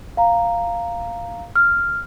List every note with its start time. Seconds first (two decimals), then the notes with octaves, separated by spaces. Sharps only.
0.17 F5 A#5
1.56 F6